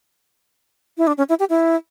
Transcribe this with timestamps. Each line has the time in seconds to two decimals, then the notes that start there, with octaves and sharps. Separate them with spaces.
0.98 E4
1.07 D4
1.18 C#4
1.29 E4
1.39 G4
1.50 E4